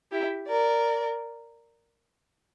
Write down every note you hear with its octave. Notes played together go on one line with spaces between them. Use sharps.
E4 G4
A#4 D5